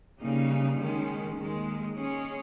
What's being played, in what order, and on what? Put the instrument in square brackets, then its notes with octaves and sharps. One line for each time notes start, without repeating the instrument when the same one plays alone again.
[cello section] C#3 G3 A#3 D#4
D#3 G#3 C#4
D#2 D#3 G#3
G#3 C#4 G#4 C#5